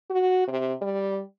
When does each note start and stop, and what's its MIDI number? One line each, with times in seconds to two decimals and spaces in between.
0.10 0.45 66
0.48 0.73 48
0.82 1.21 55